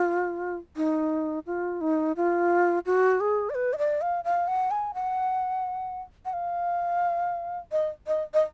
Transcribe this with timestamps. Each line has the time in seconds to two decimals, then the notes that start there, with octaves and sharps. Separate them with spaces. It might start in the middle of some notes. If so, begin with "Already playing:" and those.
Already playing: F4
0.77 D#4
1.47 F4
1.81 D#4
2.17 F4
2.86 F#4
3.20 G#4
3.50 D5
3.55 B4
3.73 D#5
3.78 D5
4.01 F5
4.24 F5
4.48 F#5
4.71 G#5
4.94 F#5
6.25 F#5
6.33 F5
7.72 D#5
8.07 D#5
8.34 D#5